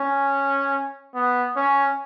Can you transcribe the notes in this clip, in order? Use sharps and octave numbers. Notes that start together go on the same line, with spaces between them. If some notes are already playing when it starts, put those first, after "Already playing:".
Already playing: C#4
B3
C#4